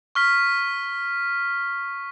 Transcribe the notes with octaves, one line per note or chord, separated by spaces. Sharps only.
C#6 F6 B6